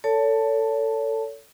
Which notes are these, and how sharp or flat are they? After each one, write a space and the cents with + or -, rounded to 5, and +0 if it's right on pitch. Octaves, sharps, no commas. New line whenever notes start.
A4 +20 C#5 +30 A5 +0